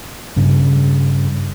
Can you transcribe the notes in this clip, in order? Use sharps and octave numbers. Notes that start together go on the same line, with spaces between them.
G2 C#3